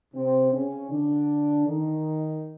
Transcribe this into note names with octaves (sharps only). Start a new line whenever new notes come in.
C3 C4
C#3 C#4
D3 D4
D#3 D#4